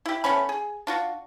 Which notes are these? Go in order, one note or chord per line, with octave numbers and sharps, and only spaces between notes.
E4 G4
A3 B3 C#4 B5
G#4
D4 F4 F#4